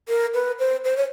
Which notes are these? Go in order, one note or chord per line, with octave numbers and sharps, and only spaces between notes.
A#4
B4
C5
C5
C#5